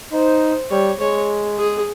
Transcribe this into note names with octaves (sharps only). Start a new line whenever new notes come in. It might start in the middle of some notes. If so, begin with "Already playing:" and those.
D#4 C5
G3 C#5
G#3 C#5
G#4